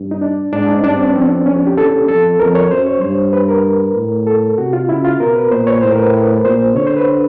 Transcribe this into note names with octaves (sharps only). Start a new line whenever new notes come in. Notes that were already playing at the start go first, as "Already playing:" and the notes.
Already playing: G2
D#4
D4
G#2 D4
D#4
C#4
G2 D4
C4
C#4
B3
F2 C4
F2 C#4
D4
G4
E2 A4
F2 A4
F2 A#4
C#5
F#2 C5
C#5
G2 C5
B4
A#4
A2
A4
C3 F#4
F4
C#3 E4
F4
B2 A#4
B4
A#2 C5
C#5
A2 C5
A#4
B4
A#2 C5
D3 C#5
C5
B4